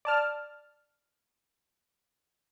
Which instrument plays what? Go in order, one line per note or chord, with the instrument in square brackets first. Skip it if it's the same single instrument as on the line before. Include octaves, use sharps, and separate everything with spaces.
[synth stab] D5 A5 F6